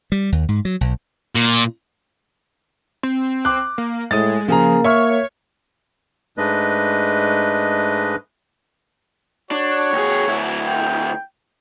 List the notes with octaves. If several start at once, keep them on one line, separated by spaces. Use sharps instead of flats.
G3
D#2
G#2
F#3
B1
A#2
C4
D6 F#6
A#3
A2 G#3 D#6 A6
C#3 F3 A#3 G#4 A#5
C#5 E5 C#6 F6
G#2 G#3 A3 D4 B4 D#5
D4 F#4 C#5
D#2 G#4
D2 E4
G5